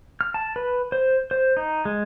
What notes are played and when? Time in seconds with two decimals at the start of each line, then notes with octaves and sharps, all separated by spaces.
0.21 F6
0.34 A5
0.56 B4
0.92 C5
1.31 C5
1.57 D#4
1.85 G#3